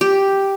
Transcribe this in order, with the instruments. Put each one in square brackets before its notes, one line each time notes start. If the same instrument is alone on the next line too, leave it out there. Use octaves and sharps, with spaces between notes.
[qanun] G4